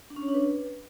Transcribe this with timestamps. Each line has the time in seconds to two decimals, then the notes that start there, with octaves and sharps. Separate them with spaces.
0.10 D4
0.16 C#4
0.22 C#5
0.28 D4
0.34 B4